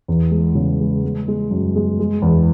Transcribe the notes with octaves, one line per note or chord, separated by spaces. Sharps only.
E2
G#3
C#3
G#3
G#3
G#3
F#2
G#3
G#3
E2